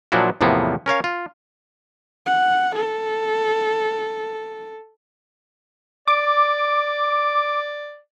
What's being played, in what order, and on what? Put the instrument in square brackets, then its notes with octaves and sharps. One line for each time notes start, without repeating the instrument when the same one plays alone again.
[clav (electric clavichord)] A#2 F3 F#3 D4 E4 F#4
E2 A2 C3 F3 A#3 B3
C#4 A#4 C#5 F5
F4
[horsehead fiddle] F#5
A4
[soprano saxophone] D5 [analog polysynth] D6